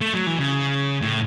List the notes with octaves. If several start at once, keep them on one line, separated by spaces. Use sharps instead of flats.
A3
F#3
E3
C#3
A2